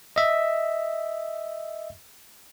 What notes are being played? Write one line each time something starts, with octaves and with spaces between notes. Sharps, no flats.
D#5 E5